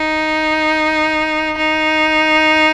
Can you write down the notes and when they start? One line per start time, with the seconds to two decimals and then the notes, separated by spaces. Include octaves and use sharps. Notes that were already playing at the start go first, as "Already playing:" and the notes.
Already playing: D#4
1.57 D#4